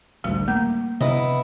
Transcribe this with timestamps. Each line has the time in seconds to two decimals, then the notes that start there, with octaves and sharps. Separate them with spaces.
0.24 A1 D2 G3
0.48 A3 A#3
1.00 C3 B3 E4 D#5